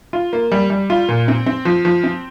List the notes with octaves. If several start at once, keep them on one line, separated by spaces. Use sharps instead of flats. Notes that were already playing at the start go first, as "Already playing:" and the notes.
F4
A#3
G3
G3
F4
A#2
C4
C4
F3
F3
C4